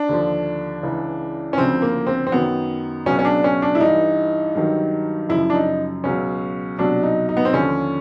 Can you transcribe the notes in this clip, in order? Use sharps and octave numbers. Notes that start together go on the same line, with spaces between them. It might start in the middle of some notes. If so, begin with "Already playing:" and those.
Already playing: D4
D#2 D3 F3
C#2 C#3 E3
C#4
D2 C#3 F3 C4
A#3
C4
C4
F#2 D#3 F#3 B3
C#2 B2 F#3 C#4
C#4
D4
C#4
D4
E4
G2 E3 D#4
G2 D#3 F#3
F#2 C#3 F3 E4
D4
D#4
C#2 B2 F#3 C#4
C2 B2 F#3 D4
D#4
D#4
B3
C4
D#2 D3 F3 C#4